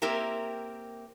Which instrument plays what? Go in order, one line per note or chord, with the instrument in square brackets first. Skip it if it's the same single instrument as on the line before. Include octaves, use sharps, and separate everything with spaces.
[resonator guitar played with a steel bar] A#3 C4 E4 G4 A#4